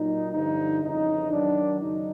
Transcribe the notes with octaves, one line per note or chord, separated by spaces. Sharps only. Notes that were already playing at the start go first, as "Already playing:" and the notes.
Already playing: A#2 F#3 D#4
G2 D3 F3 D#4
F2 C#3 E3 D#4
F#2 D#3 F#3 D4
F#2 C#3 D#4